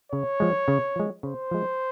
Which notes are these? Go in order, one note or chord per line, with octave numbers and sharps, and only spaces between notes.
C#3 C#5
F3 G#3
C#3
F3 G#3
C#3 C5
F3 G#3